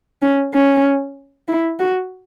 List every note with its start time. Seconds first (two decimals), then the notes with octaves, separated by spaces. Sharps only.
0.22 C#4
0.54 C#4
1.48 E4
1.79 F#4